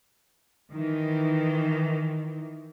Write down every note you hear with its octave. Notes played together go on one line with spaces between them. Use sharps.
D#3 E3